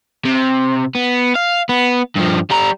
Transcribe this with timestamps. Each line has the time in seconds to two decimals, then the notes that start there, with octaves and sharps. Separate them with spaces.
0.25 C3
0.95 B3
1.35 F5
1.69 B3
2.16 G2 F3
2.51 G3 A#5